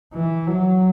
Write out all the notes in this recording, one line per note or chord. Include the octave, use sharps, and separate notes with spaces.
E3
F#3